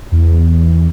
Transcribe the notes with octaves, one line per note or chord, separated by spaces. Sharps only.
E2